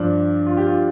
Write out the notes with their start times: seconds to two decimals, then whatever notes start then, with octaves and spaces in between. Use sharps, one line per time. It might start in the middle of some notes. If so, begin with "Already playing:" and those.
Already playing: G2 F3 D4
0.46 F4
0.57 G4
0.67 F4